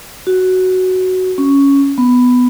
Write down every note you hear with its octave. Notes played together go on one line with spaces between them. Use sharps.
F#4
C#4
B3